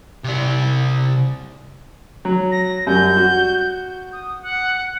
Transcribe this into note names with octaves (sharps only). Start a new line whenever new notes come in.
C3 D5
F#3
A#6
F#2 G3 G6
F#4
D#6
F#5